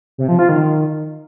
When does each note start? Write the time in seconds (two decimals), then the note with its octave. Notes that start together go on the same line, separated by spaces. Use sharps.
0.18 C3
0.29 F3
0.39 F4
0.49 D#3